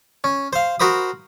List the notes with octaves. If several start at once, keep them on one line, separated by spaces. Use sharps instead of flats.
C#4
C5 F5
F#4 A#4 C5 B5 D#6